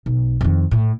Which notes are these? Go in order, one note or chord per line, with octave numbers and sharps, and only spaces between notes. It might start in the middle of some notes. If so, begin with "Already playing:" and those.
B1
F2 D#3
A2